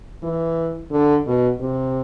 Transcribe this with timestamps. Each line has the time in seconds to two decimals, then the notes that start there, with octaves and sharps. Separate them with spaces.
0.23 E3
0.91 D3
1.26 B2
1.60 C3